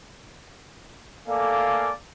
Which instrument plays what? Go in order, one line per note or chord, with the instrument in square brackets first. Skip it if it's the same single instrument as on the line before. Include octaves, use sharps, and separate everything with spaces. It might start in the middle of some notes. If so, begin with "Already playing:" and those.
[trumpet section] A3 A#3 A4 D5 F5 G#5